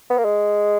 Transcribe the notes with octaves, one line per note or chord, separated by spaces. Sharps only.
B3
A#3
G#3